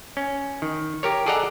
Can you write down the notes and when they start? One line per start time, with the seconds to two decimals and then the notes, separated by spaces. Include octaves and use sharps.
0.17 C#4
0.62 D#3
1.03 G4 A#4 C#5
1.26 G#4 A4 D5 D#5 F#5 A#5